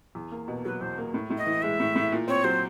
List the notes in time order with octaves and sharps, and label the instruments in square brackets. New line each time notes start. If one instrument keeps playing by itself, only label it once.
[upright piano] E2
A#3
B2
[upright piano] F#3 [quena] B4
[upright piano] E2 [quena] C5
[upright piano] A#3
A2
A2
[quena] D#5
[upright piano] E3
[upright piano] G#3 [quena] E5
[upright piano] A2
A2
A#2
[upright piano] C4 [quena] C#5
[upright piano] F#3 [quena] C5